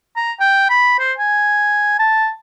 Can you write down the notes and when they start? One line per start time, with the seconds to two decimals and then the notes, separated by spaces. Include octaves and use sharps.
0.17 A#5
0.40 G5
0.70 B5
1.00 C5
1.18 G#5
1.99 A5